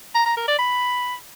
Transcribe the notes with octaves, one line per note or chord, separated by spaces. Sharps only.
A#5
A#5
A#4
D5
B5